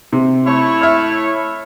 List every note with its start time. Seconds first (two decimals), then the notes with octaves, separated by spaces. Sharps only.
0.13 C3
0.46 A3 E4 C#5
0.81 E5 F6